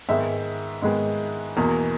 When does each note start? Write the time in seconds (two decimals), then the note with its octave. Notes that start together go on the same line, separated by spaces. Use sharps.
0.09 G#2 D#3 G#3 B3 E5
0.82 G#2 D#3 G#3 B3
1.57 E2 B2 A#3